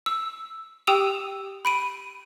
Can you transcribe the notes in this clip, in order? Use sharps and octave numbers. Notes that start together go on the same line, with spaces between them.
E6
G4 G5 D#6 E6 D#7 F7
B5 D7 D#7